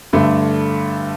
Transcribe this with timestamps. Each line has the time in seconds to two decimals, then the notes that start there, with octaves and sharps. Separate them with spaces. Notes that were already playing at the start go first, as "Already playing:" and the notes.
0.13 G2 D3 A3 D4